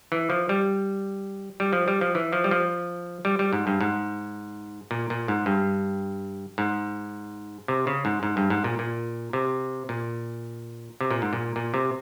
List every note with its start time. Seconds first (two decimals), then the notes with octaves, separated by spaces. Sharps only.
0.12 E3
0.30 F3
0.49 G3
1.60 G3
1.73 F3
1.88 G3
2.01 F3
2.15 E3
2.33 F3
2.44 G3
2.51 F3
3.25 G3
3.39 G3
3.53 G#2
3.67 G2
3.81 G#2
4.91 A#2
5.10 A#2
5.28 G#2
5.46 G2
6.58 G#2
7.68 C3
7.87 C#3
8.05 G#2
8.23 G#2
8.37 G2
8.50 G#2
8.64 A#2
8.79 A#2
9.33 C3
9.89 A#2
11.01 C3
11.11 A#2
11.22 G#2
11.33 A#2
11.56 A#2
11.74 C3